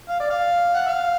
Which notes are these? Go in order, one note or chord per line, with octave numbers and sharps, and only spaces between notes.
F5
D5
F5
F#5
F5